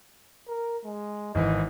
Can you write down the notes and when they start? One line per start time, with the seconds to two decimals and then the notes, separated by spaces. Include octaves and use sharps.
0.48 A#4
0.85 G#3
1.35 G#1 E3 D#5